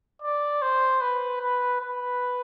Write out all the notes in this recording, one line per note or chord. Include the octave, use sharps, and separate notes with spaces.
D5
C5
B4
B4
B4